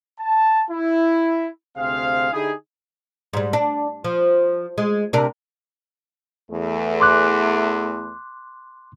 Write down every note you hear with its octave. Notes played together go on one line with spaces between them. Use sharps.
A5
E4
D2 C3 C4 G#4 C5 F5
D3 D#4 E4 G4 G#4
G#2 G3
D4
F3
G#3
C3 D4 A#4
E2 A3
C6 D6 F#6